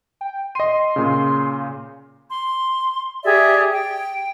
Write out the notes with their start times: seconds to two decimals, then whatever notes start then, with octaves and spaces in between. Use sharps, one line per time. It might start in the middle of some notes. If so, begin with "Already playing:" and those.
0.21 G5
0.55 D#5 C6 D#7
0.96 A#2 C#3
2.28 C6
3.24 G4 G#4 D5 E5
3.71 G5